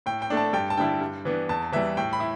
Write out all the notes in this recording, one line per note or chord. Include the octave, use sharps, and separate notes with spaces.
A2 G5
G5
A3 D4
A5
G2 G5
A5
D3 G3 E4 G5
G2
E3 B3 D4
E2 A5
E3 G3 E5
A2 G5
B5
E4